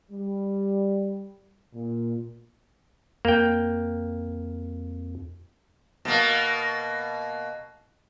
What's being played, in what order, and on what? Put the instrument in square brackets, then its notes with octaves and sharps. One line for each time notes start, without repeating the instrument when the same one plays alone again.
[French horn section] G3
A#2
[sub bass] F2 [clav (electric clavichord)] A#3 G5
[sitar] B2 A#3